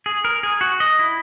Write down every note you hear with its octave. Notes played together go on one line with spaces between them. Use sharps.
G#4
A#4
G#4
F#4
D#5
E4